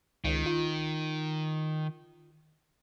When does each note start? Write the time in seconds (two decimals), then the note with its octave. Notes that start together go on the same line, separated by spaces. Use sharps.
0.25 C#2 D#3
0.46 F4